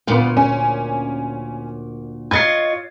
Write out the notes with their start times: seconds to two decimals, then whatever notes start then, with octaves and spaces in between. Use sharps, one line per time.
0.07 D2 A#2 B3 F4 A#4
0.37 C#4
2.31 F4 C#5 D#5 G#6 A6 C7